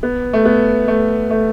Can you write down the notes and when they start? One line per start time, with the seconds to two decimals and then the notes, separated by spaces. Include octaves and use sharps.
0.03 B3
0.33 A3
0.45 B3
0.88 A3
1.31 A3